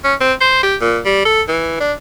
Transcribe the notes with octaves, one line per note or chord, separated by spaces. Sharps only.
C#4
C4
C5
G4
A#2
G3
A4
E3
D4